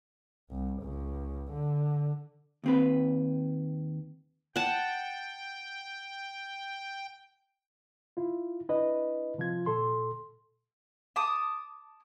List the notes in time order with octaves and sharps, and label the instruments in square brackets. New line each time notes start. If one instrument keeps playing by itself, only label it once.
[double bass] C2
C#2
D3
[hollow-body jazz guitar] D#2 C4 B4
[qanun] F#5 A5 [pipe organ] G5
[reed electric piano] E4 F4
D4 E4 B4 D#5
C3 F3 F4 G#6
A#2 A4 C6
[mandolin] A5 D6 D#6